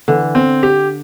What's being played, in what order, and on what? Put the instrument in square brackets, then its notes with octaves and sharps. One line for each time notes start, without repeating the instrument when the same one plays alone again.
[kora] D3 [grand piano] E3
[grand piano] C4
G4